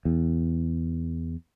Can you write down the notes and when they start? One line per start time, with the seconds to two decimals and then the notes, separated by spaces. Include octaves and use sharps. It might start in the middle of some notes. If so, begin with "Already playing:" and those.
0.05 E2